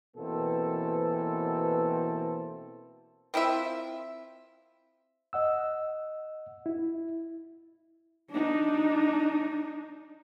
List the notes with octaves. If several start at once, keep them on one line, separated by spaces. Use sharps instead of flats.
B2 E3 A#3 C4 A4
C4 E4 F4 E5
D#5 F#5 E6
E4
D4 D#4